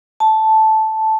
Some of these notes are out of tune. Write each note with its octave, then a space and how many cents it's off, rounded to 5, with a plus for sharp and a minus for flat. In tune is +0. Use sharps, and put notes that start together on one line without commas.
A5 -5